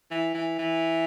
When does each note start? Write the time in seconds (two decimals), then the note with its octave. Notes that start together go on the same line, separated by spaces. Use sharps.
0.11 E3
0.34 E3
0.58 E3